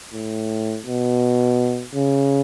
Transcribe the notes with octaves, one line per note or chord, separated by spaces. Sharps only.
A2
B2
C#3